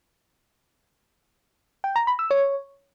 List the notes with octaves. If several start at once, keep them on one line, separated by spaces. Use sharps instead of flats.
G5
A#5
B5
E6
C#5